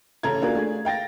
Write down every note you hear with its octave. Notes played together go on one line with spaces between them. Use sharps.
A1 C#3 A4 A#5 G#6
A#3 D4 F4 F#4 G#4 A#4
A3 D4 G#4
F5 G5 A6 A#6